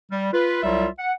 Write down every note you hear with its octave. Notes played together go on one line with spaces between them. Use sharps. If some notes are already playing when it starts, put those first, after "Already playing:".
G3
F4 B4
C2 F#3 G3 F4 E5
F#5